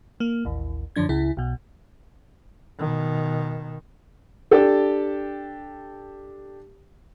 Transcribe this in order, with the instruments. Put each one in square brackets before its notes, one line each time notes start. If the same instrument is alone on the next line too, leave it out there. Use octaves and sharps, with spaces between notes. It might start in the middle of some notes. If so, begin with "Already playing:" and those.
[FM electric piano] A#3
A1 D#2
F#2 D3 F3 D4 G#6
C#2 C#3 E4
B1 B2
[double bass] B2 D#3
[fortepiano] D4 G4 A4